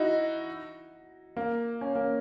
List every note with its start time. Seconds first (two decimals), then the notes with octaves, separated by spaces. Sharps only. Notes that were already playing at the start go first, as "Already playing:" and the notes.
Already playing: D#4 E4 F#4
1.37 A#3
1.81 C#4
1.95 A#3